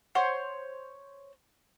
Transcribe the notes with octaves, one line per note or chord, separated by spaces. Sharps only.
C5 C#5 F#5